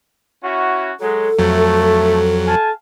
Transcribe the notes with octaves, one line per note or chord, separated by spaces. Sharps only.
C#4 E4 F#4
F#3 G#3 A4
F2 F#3 A3
F5 G#5 A5